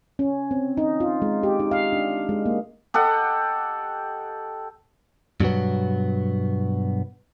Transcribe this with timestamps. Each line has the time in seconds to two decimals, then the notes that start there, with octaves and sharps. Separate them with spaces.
0.19 C#4
0.51 C4
0.77 D#4
1.00 F4
1.22 G#3
1.43 G4
1.59 D#4
1.71 F5
1.93 D4
2.29 G#3
2.46 A#3
2.94 G4 A4 D#5 F#5
5.40 G2 B2 F#3 B3